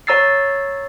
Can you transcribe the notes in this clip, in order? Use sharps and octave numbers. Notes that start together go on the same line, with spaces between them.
C#5 A#5 E6 A6 C7